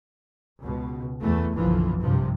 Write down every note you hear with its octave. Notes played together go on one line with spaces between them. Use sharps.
C#2 B2
E2 E3 A3
F#1 B1 D3 E3 F3
A#1 G2 C3 F3